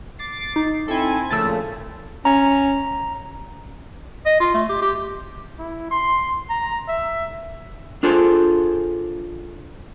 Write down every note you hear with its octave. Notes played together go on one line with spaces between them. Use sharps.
D6 A6 C7
D#4
C4 E4 A4 G#5
A#2 C#3 F3 A3 E6 A6
C#4 A#5
D#5
F4
A3
G4
G4
E4
C6
A#5
E5
D4 F4 G#4 A4 C5